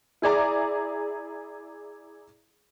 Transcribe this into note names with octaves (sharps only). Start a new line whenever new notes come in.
E4 G#4 D5 A#5